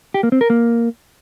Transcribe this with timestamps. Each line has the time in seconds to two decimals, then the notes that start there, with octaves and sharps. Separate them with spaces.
0.14 G4
0.23 A#3
0.32 C4
0.41 A#4
0.50 A#3